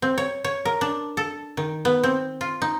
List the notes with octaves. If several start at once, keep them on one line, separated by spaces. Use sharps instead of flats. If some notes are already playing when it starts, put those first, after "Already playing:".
C4
C#5
C#5
A#4
D4
A4
D#3
B3
C4
F4
D#4